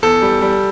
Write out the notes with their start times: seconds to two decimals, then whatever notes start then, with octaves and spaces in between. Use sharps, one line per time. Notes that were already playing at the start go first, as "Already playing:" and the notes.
0.02 E2 A4
0.22 G3
0.41 G3